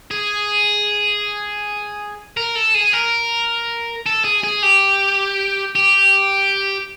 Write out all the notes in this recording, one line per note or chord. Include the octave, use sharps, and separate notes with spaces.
G#4
A#4
A4
G#4
A#4
A4
G#4
G#4
G4
G4